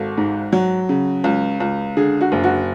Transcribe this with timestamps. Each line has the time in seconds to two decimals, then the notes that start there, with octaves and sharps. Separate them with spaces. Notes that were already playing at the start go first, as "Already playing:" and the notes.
Already playing: G#1 F#4 A4
0.18 G#2
0.52 F#3
0.89 C#3
1.24 C#2
1.60 C#2
1.97 D3 G#4
2.21 F#4
2.32 F#1
2.44 F#4